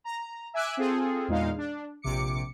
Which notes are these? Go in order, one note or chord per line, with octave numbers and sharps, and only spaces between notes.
A#5
E5 G#5 D6 E6 F#6 D7
C4 F4 G#4 A4
E2 A#2 G#3 D#4 F5
D4
A#1 C3 D6 C#7